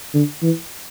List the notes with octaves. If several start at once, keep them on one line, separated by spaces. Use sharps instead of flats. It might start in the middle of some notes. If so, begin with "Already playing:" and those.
D3
E3